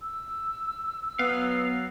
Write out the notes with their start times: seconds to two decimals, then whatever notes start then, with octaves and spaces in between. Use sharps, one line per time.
0.01 E6
1.19 F#3 B3 F5